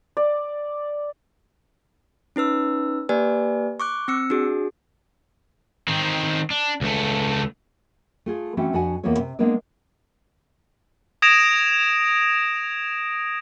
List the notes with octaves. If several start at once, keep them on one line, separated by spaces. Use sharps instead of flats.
D5
C#4 D#4 B4 E6
A#3 G4 B4 D5 G#5
C#6 D6 F#6
C4 E6 C#7
D4 F#4 G#4
D#3 C4
D4
C#2 A3
A3 F4 G#4
E3 A3 C4 C#4 F#4
F2 D4 F#4 F#5 G#5
E2 E3 A#3 B3 F4 C#5
C3
G#3 A#3 B3 D4 D5
D#6 G#6 A#6 D7 E7 F7